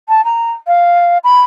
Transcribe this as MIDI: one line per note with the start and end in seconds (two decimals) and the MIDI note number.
0.09 0.24 81
0.25 0.51 82
0.67 1.18 77
1.24 1.43 83